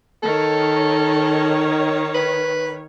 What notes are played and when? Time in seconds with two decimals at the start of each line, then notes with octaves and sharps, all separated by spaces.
0.23 D#3 A4 C#5
2.14 B4